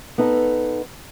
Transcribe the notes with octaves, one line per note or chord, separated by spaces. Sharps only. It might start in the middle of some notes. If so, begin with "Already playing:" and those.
B3 D#4 A4